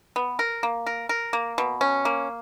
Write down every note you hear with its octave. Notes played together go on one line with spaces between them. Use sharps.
B3
A#4
A#3
A#4
A#4
A#3
B2
C#4
A#3